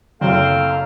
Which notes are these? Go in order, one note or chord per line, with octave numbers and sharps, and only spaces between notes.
F#1 F#2 A3 C4 F5